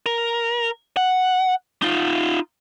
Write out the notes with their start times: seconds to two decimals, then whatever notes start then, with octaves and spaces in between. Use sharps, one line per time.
0.06 A#4
0.97 F#5
1.82 D#4 F4